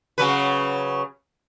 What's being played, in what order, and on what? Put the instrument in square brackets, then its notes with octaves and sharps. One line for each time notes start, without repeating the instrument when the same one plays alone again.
[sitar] C#3 F#3 B4